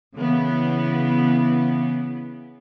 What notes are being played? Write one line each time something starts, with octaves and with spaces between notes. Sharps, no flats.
C#3 E3 B3